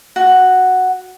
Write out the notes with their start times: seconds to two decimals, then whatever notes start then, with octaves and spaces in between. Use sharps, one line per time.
0.16 F#4